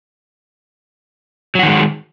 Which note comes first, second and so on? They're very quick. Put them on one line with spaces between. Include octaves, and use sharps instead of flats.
F#3 F#4 D#3 G#3